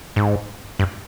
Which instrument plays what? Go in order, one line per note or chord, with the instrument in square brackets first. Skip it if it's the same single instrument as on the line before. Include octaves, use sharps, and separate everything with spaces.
[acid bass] G#2
G2